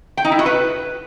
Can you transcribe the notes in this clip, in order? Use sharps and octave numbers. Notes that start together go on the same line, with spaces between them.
G5
D#4
E4
F#4
B4